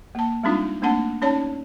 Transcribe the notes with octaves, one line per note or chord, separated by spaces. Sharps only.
A#3 A5
G3 G#3 C4 D4 D#4 F4
A3 A#3 C4 D4 F#5 A5
C#4 D#4 C#5 D5 A5